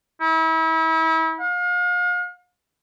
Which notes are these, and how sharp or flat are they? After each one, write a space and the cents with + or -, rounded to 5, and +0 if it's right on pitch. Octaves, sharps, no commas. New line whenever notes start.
E4 -35
F5 +40